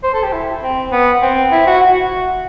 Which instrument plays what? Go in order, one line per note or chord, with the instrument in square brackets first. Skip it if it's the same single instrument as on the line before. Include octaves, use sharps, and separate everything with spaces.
[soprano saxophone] C5
A4
G4
E4
C4
B3
C4
E4
F#4
F#4